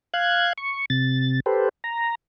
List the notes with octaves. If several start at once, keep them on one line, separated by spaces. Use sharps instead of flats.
F5 F#6 G#6
C#6
C3 A6
G4 A4 B4 C5
A#5